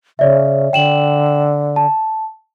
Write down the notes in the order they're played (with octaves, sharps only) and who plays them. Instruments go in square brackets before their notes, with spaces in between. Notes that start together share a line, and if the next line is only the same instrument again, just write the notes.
[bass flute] C#3 [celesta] C#5 D5 E5
[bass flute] D3 [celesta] G5 E7 F#7
[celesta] A5